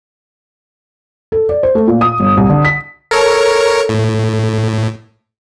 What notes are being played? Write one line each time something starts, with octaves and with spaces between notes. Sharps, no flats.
A4
D5
C5
A3
A#2
D#6
G1
C2
D3
B6
A4 A#4 C#5
A2